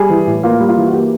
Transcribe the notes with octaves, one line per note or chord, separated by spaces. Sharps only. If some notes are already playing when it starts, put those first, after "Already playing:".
Already playing: G3 G#4
E3
A2
A#3 F4
G3
F4
E3
F#4
A#3 G4